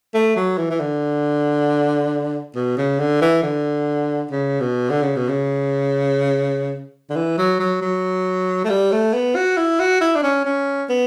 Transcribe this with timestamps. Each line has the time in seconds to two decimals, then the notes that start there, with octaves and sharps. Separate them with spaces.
0.15 A3
0.36 F#3
0.58 E3
0.70 E3
0.80 D3
2.55 B2
2.78 C#3
2.99 D3
3.21 E3
3.43 D3
4.31 C#3
4.60 B2
4.90 D3
5.02 C#3
5.16 B2
5.29 C#3
7.10 D3
7.16 E3
7.38 F#3
7.60 F#3
7.81 F#3
8.65 A3
8.70 G3
8.92 A3
9.13 B3
9.36 F#4
9.57 E4
9.80 F#4
10.01 E4
10.15 D4
10.23 C#4
10.45 C#4
10.89 B3